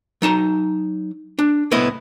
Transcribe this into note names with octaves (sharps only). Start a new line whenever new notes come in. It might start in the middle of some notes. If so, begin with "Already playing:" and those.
F#3 D#4 A5 A#5
D4
C2 A2 B3 E4 D#5